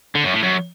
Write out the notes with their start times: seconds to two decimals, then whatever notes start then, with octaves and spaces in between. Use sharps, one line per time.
0.15 D3
0.24 F#2
0.34 A2
0.43 F#2